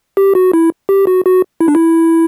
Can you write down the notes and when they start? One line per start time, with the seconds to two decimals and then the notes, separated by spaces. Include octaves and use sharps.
0.17 G4
0.35 F#4
0.53 E4
0.89 G4
1.07 F#4
1.26 F#4
1.61 E4
1.68 D4
1.75 E4